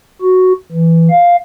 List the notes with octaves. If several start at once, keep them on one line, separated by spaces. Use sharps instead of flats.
F#4
E3
F5